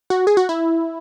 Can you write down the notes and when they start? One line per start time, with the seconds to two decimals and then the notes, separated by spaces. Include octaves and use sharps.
0.10 F#4
0.27 G#4
0.37 F#4
0.49 E4